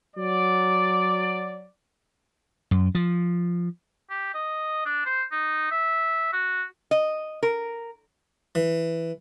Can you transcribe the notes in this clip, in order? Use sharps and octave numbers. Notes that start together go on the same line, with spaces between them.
F#3 D5
F#2
F3
G4
D#5
D4
C5
D#4
E5
F#4
D#5
A#4
E3